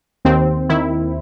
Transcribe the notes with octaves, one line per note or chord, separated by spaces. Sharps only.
D#2 C4
D#3 E4